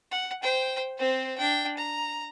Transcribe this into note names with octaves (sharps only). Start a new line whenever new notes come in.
F#5
C5 G5
C4 C5
D4 G5
A#5